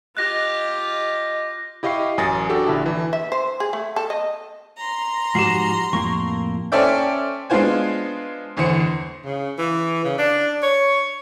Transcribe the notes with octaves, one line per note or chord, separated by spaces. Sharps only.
F4 G4 D#5 F#6 A#6
E4 G4 D#5 F5 C#6 C7
A1 F#2 G#5 D#6 A6 A#6
D4 F#4 G4 A4
A#1 D3 E4 A5
E3
E5
C5
G#4
A3
A4
D#5
A#5 C6
G#2 F3 F#4 G4 C7
F2 A2 A#3 C#6
C#4 A4 C5 D5 E5 G5
G#3 B3 D4 F4 C5 G#5
G1 E2 E3 C5 C#7
C#3
E3
C#3
D4
C#5